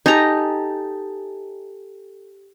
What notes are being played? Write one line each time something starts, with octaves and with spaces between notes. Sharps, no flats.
D#4 G4 A4 G#5 A#5